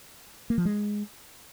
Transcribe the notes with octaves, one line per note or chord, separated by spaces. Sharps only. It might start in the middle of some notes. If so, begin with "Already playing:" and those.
A#3
F3
G#3